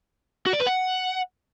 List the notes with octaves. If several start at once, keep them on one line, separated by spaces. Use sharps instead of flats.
F#4
D5
B4
F#5